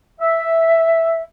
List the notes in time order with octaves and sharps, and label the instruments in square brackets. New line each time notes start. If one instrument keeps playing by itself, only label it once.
[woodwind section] E5